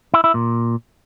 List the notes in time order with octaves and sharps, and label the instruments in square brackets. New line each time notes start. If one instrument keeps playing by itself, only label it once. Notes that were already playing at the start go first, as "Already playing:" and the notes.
[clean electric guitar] E4
E4
A#2